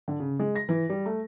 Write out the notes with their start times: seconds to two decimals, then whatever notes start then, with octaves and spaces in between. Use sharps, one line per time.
0.08 D3
0.20 C#3
0.39 G#3
0.56 A#6
0.69 E3
0.90 G3
1.06 A3